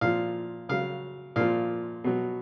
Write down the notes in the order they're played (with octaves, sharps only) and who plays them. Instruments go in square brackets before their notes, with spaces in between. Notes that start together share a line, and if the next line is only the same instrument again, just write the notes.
[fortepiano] A#2 F3 F5
C#3 F#3 F5
A#2 F3 F5
B2 F#3